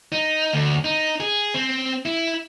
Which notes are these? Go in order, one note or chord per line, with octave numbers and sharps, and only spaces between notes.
D#4
D2
D#4
G#4
C4
E4